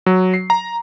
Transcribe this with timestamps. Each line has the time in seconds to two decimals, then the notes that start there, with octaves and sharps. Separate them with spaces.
0.06 F#3
0.34 C7
0.50 A#5